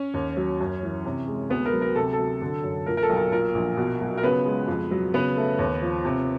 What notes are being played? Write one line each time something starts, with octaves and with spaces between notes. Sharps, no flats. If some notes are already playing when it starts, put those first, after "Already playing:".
Already playing: C#4 C#5
D#2
F#3
F#2
E3
C3
G#3
D2 B3 B4
A#4
F#3
A#4
C3 A4
A4
F#3
D3
F#2
A#2 A#4
A#4
A4
B1
A#4
A#2 A#4
A#1
B2
B1
A#4
C#3 B3 B4
G#3
F2
F#3
C#3 B3 B4
A3
D#2
F3
C3